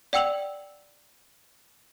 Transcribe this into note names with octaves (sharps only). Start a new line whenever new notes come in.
D5 F#5 G5 E6 F7 F#7